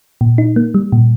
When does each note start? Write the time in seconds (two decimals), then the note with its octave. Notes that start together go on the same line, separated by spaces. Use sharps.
0.21 A#2
0.38 D#4
0.56 A#3
0.74 G3
0.92 A#2